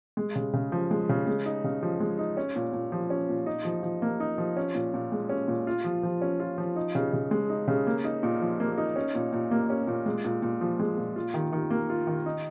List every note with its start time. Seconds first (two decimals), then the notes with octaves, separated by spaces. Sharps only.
0.17 G#3
0.36 C#3
0.53 C#3
0.72 F3
0.91 G#3
1.09 C#3
1.27 G#3
1.46 D#4
1.64 C#3
1.83 F3
2.00 G#3
2.18 D#4
2.37 C#4
2.56 A#2
2.73 A#2
2.92 F3
3.10 C#4
3.29 A#2
3.46 D#4
3.65 F3
3.83 F3
4.02 A#3
4.20 D#4
4.38 F3
4.57 C#4
4.75 A#2
4.94 A#2
5.12 G#3
5.29 C#4
5.48 A#2
5.67 F4
5.84 F3
6.03 F3
6.22 C#4
6.40 F4
6.58 F3
6.76 D#4
6.95 C#3
7.13 C#3
7.31 G#3
7.50 D#4
7.68 C#3
7.87 A#3
8.04 D#4
8.23 A#2
8.41 F3
8.60 A#3
8.77 D#4
8.96 C#4
9.15 A#2
9.33 A#2
9.51 A#3
9.70 C#4
9.87 A#2
10.06 G#3
10.25 A#2
10.42 A#2
10.61 F3
10.79 G#3
10.98 A#2
11.16 F4
11.34 D#3
11.52 D#3
11.70 A#3
11.90 F4
12.07 D#3
12.26 D#4